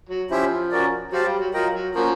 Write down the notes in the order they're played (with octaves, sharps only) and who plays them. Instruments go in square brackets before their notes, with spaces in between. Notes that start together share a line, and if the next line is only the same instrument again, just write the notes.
[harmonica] F#3
[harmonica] F3 [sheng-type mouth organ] C#4 E4 G4 C5 E5
[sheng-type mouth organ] C#4 F#4 A#4 D5
[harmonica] F#3 [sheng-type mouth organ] G4 C5 F5 A5
[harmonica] G3
F#3
[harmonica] F#3 [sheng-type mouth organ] F4 A#4 D#5 G5
[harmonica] F#3
[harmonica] F3 [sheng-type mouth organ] A#3 C#4 F#4 A#4